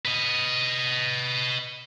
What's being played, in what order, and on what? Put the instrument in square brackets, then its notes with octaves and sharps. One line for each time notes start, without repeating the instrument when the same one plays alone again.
[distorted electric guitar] B4 D#5